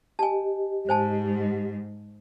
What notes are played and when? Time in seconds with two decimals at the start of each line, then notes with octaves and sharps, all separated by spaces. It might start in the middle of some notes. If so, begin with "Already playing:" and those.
0.19 G4 D#5 G#5 A5
0.89 G#2 C5 G#5 A5